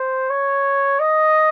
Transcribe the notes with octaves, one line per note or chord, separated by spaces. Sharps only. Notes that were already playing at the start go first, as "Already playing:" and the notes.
Already playing: C5
C#5
D#5